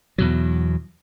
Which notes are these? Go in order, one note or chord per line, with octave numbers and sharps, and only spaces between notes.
E2 B2 F#3